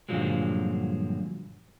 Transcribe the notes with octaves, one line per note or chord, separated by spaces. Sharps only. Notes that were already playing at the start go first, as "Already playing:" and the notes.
G2 A#2 D3 F3 F#3 G#3